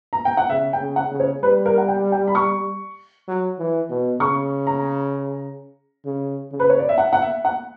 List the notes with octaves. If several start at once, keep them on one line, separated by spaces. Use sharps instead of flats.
A#5
G5
F#5
C#3 E5
G5
C#3
F#5
C#3
C#5
G3 B4
A#4
F#5
G5
G5
B5
C#6
F#3
E3
B2
C#3 C#6
A#5
C#3
C#3
B4
C#5
D5
E5
F#5
F#5
E5
F#5